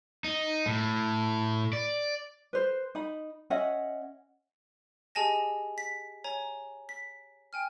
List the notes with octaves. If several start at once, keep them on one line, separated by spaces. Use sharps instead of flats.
D#4
A2
D5
B4 C5
D#4 B5
C#4 D#5 E5 F#5
G4 G#4 D#5 G#5 A5 A#6
B6
C#5 G#5 A#5
B6
G5 G#5 F6